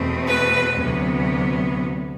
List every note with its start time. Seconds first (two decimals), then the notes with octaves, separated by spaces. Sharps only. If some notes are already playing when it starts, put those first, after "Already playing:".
Already playing: E2 B2 A3 C4
0.26 B4
0.79 D2 C3 F#3 B3